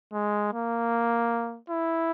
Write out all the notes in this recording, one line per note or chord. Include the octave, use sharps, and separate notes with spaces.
G#3
A#3
E4